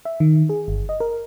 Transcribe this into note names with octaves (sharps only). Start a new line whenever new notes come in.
E5
D#3
G#4
G1
D#5
A#4